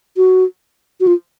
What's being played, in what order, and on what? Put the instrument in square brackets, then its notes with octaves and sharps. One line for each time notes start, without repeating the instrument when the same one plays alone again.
[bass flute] F#4
F#4
F4